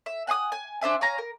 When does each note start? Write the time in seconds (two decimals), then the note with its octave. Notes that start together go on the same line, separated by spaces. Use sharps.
0.06 E5
0.27 F#5 G#5 C6 D#6
0.52 G#5
0.81 D4 C5 E5 G#5
1.01 C#5 F5 G#5 A#5
1.18 A#4